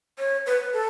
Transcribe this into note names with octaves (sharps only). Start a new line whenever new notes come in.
C#5
B4
A4